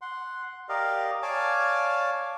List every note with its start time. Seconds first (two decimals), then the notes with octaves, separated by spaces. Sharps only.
0.01 F#5 C6
0.69 G4 A#4 D5 D#5 F5
1.22 C#5 D5 F5 G#5 A5 D6